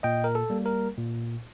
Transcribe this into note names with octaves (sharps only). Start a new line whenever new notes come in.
A#2 D#5 G5
A#4
A4
G3 A#3
A#4
A#2